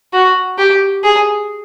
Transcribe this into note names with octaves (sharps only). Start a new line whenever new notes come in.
F#4
G4
G#4